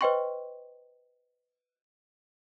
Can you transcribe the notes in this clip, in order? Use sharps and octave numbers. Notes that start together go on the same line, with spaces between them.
B4 C5 D#5 G5 C6 C#6